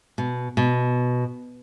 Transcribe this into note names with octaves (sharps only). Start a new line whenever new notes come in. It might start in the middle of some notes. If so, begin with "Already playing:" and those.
B2
B2